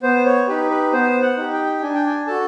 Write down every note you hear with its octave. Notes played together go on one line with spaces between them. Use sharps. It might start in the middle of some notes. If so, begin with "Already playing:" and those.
B3 C5
C#5
D#4 G4 B4
B4
B3 C5
F#5
D#4 G4
G5
D4 G#5
G5
G#5
F#4 A4 A5